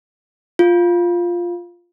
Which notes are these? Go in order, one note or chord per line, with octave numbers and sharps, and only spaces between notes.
F4